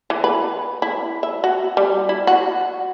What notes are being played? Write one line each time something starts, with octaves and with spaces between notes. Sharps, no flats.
E3
B4
E4
E5
F#4
G3
E4
F#4